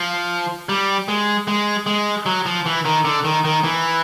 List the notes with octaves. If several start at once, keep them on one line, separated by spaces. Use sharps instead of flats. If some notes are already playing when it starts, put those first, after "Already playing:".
Already playing: F3
G3
G#3
G#3
G#3
F#3
F3
E3
D#3
D3
D#3
D#3
E3